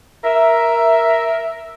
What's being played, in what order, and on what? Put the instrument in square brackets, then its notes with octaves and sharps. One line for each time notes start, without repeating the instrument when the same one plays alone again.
[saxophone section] A#4 E5